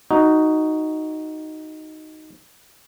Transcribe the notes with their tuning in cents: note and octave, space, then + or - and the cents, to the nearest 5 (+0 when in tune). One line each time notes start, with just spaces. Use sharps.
D#4 +0 F#4 +5